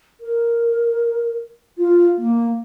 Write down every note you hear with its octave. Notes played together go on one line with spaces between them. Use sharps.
A#4
F4
A#3